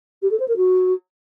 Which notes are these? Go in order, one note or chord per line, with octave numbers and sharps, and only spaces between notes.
G4
A4
C5
A#4
F#4